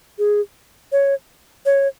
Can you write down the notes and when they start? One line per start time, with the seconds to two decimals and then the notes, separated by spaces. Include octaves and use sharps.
0.19 G#4
0.92 C#5
1.66 C#5